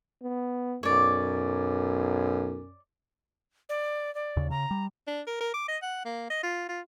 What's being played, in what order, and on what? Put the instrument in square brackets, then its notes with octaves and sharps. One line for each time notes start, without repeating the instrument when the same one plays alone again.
[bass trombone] B3
[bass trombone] B1 [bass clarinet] F#2 [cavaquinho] C#5 D5
[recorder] D5
D5
[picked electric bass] D#2 C#3
[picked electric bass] C#3 [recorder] A#5
[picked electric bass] G3
[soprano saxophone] D4
A#4
A#4
D6
D#5
F#5
A#3
D#5
F4
F4